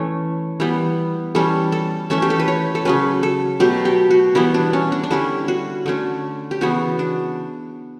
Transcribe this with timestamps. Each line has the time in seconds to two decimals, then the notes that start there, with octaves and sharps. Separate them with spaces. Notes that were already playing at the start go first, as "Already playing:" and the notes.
Already playing: E3 A3 C#4 C#5
0.60 E3 G3 B3
1.35 E3 G3 C#4 A4
1.72 A4
2.10 E3 A3 C#4 E5
2.22 G4
2.30 A4
2.40 B4
2.48 C#5
2.75 A4
2.85 C#3 F#3 C#4 B4
3.23 A4
3.60 B2 F#3 A3 G4
3.85 G4
4.11 F#4
4.35 E3 G3 B3 E4
4.54 D4
4.73 C#4
4.92 D4
5.04 D4
5.11 D3 G3 C#4 E4
5.48 F#4
5.86 D3 A3 C#4
6.51 G4
6.61 C#3 E3 B3 F#4
6.99 D4